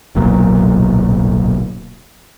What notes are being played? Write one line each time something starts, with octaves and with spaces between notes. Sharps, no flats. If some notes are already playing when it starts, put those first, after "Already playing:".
D1 B1 A#2 F#3